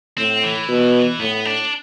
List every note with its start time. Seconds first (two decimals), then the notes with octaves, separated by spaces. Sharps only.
0.17 A2 C4
0.44 E3
0.69 B2
1.20 A2 B3
1.45 D4